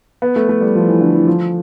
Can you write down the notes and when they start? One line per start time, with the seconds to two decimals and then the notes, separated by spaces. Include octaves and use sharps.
0.22 B3
0.36 A3
0.49 A3
0.61 G3
0.75 F3
0.88 E3
1.01 D3
1.14 E3
1.27 F3